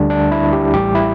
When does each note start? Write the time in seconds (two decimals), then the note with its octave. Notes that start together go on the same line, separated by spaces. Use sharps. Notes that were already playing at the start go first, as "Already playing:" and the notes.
Already playing: D2 D3 G3 D4
0.10 D4
0.31 E4
0.53 G4
0.73 A1 A2 G3 G4
0.95 E4